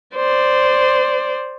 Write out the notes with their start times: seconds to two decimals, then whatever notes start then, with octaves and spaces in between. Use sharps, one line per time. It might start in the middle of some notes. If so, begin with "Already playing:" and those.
0.15 C5 D5